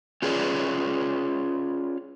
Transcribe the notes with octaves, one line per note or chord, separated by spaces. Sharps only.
C#4 F4 G#4 B4 C#5 D5